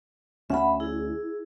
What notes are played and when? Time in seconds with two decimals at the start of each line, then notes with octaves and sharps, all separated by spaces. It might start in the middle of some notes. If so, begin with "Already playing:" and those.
0.50 D2 C#4 E5 F#5 B5
0.80 E4 G#4